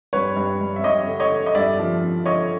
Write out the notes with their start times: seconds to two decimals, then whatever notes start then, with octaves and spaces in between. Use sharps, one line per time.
0.13 G2 B4 C#5
0.36 G2
0.60 G2
0.76 E5
0.84 G2 C#5 D#5
1.08 D3
1.20 C#5 D#5
1.31 D3
1.46 D#5
1.55 G2 D5 E5
1.79 F3
2.02 F3
2.26 D3 C#5 D#5